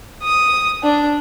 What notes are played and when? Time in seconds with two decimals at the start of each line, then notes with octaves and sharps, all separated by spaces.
0.23 D#6
0.83 D4